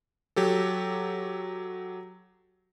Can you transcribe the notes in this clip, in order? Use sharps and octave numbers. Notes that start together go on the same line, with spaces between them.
F#3 G4 A4